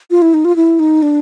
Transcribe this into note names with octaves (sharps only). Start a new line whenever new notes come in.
F4
E4
D#4
F4
E4
D#4
D4